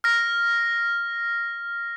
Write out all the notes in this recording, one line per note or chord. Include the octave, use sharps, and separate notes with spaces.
F6 A#6